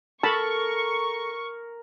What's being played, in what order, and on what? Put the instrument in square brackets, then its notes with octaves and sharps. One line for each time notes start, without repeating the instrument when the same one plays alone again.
[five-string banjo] A4 [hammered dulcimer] A#4 [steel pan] A5 B5 [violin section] C#6